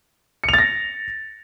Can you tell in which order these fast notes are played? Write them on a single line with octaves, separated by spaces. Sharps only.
C#7 F7 A6 A#6